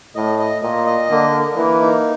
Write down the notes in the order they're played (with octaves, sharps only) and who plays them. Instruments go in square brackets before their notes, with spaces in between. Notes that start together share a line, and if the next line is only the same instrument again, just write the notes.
[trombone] A2 [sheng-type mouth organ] D#5
[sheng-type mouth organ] D#5
[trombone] A#2 [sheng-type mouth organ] D#5
[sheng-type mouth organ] D#5
[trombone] D3 [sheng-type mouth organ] A#3
[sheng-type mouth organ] A#3
[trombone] E3 [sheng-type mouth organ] A#3
[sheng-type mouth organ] D#4